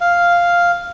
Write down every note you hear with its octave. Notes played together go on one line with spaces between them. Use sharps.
F5